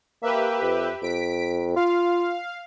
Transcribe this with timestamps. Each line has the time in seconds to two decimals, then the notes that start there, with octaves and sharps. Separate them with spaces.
0.22 A#3 G4 B4 E5
0.62 F2
1.02 F2 B6 D7
1.76 F4 F5